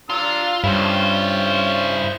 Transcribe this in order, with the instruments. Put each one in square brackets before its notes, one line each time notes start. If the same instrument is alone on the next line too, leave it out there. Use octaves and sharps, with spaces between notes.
[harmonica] D4 A#5 E6 [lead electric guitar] F4
[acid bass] G2 [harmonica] C#4 F4 [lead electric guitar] E4 C5